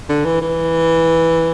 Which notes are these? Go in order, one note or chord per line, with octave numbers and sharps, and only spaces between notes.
D3
E3
E3